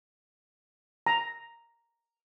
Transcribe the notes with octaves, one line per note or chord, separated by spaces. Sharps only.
A#5